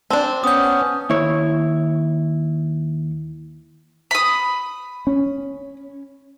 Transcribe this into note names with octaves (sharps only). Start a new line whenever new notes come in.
C4 D4 A5
B3 C#4 D#6 G6
D#2 E4 C#5
B5 D#6
C#4